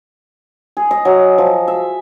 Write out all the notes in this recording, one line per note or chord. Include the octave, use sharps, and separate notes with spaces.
G#4
D#5
F#3
F3
E5